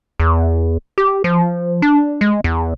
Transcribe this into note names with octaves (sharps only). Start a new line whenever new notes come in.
E2
G4
F3
D4
G#3
E2